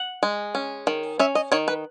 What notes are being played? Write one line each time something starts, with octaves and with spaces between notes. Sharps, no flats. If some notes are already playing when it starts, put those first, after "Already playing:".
Already playing: F#5
G#3
C#4
D#3
C#4 E5
D#5
D#3 C#5
B4